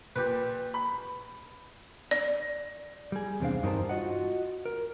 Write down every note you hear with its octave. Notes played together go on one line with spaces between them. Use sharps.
A#2 G4 B4
B5
D5
G3 G#4
E2 C3 E3 C4 D4 F5
G2 D#4 G4 A#4 C5 A5
F4 F#4 D#5 F#5
A#4